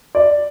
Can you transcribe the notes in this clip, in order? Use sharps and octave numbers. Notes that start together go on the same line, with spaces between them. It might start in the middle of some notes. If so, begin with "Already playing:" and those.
D5